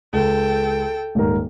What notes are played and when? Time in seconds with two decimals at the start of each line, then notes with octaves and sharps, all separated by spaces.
0.13 C#2 A4 G5
1.15 D#1 G#2 A#4